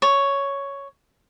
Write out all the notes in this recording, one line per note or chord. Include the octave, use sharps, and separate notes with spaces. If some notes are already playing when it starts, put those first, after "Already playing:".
C#5